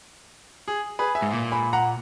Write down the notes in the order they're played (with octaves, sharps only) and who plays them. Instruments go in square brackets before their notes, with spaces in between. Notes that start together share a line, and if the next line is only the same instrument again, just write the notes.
[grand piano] G#4
G#4 B4
E5 G#5
[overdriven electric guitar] G#2
A#2
[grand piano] G#5 B5
F#5 A#5